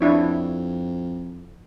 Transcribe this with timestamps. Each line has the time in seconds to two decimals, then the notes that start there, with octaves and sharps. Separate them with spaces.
0.01 F2 D4 E4 C#5